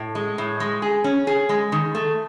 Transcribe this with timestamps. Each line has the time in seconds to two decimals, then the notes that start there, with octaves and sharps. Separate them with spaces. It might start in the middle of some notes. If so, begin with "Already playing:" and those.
Already playing: A2
0.15 G#3
0.38 A2
0.60 G#3
0.82 G#4
1.04 C#4
1.27 G#4
1.49 G#3
1.72 D#3
1.95 A3